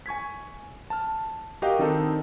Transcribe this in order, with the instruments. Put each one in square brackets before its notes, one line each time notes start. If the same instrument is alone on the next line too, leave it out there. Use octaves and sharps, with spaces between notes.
[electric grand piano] G#5 C#6 G#6 B6
A5 F6
F#4 G4 A#4 D#5 F5 G5
D#3 C4 D4 D#4 A4